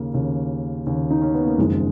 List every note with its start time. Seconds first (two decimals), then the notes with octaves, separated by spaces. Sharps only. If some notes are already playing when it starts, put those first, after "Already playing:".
Already playing: D#2 C#3 A#3
0.14 D#2 C#3
0.86 D#2 C#3
1.10 D#4
1.21 C#4
1.34 B3
1.46 A#3
1.58 F#1 F2 D#3 G#3